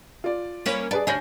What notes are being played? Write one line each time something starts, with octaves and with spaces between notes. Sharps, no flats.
F4 D5
A#3 C#4 B4
G#4 B4 D5 A5
D2 C#4 D4 G#5 G6 A#6